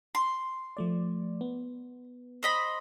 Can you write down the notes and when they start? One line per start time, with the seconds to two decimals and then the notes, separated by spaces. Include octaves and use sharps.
0.15 C6
0.77 F3 A3 D5
1.41 B3
2.43 C5 D#5 B5